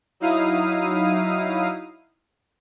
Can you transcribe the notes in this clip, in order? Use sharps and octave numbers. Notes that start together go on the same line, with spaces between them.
F#3 D#4 E4 F5 D#6 D#7